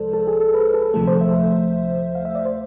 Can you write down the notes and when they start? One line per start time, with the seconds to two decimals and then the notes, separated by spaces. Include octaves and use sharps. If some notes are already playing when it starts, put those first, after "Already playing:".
Already playing: C2 C3 F3 G#3 A4 C5 D5
0.13 A4
0.27 G#4
0.40 A4
0.54 B4
0.74 A4
0.94 D2 C3 F3 A3 A4
1.08 C5
1.21 E5
2.15 F5
2.25 E5
2.35 D5
2.45 C5